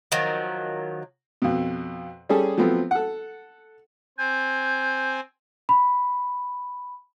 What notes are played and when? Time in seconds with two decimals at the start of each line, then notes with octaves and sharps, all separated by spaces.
0.12 D#3 F3 F#3
1.42 F2 B2
2.29 G3 C#4 G#4 A4
2.58 F3 F#3 A3 B3 C4
2.91 A4 F#5
4.18 C4 G#5 G6
5.69 B5